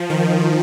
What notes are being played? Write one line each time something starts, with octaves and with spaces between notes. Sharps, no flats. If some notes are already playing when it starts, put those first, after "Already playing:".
Already playing: F3
D#3